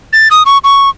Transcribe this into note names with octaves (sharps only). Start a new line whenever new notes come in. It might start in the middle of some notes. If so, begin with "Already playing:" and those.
A6
D#6
C#6
C#6